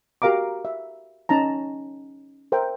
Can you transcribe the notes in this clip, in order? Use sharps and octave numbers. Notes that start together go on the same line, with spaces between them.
F#4 G4 A#4 F5 A#5 D6
E5
C#4 D#4 A5 A#5
A#4 C5 E5 G5